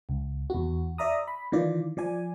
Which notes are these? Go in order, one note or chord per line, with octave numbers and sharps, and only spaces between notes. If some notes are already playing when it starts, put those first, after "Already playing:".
C#2
E2 F#4
D5 E5 A#5 D#6
B5
D#3 E3 F4 D5
F3 D5 G#5